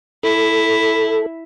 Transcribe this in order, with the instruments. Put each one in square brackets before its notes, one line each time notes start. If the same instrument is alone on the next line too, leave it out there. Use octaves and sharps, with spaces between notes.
[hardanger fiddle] E4 [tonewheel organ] A4